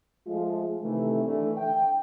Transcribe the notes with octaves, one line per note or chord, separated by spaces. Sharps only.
F3 G#3 A3 F4
C3 D#3 E3 A3
D3 E3 A3
G5